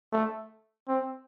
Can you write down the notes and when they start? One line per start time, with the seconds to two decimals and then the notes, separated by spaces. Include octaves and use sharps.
0.13 A3
0.88 C4